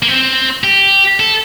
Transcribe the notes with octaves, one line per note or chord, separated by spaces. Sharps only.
A#3
C4
G4
A4